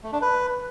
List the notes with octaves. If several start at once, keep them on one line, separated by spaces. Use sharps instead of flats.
A3
D4
B4